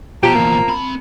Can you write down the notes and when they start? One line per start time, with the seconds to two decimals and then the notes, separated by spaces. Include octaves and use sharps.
0.23 B2 F3 G4 A#5
0.35 E2 A#2 A#3
0.68 C4 B5